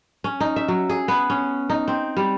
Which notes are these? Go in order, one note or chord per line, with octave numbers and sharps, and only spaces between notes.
C#4
D#4
E5
F#3
G#4
B3
C#4
D#4
C4
G3